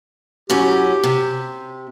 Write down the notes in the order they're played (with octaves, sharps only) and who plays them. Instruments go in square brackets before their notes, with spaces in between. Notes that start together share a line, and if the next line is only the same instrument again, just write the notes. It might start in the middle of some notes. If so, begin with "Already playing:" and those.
[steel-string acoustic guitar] F#2 A2 C#4 [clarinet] G4
[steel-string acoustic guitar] C3